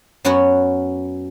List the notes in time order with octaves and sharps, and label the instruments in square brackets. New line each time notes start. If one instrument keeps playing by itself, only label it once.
[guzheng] F#2 B3 C#4 F#4 C#5 F#5